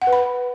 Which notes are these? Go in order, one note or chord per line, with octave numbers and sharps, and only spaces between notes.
F#5
B4
B5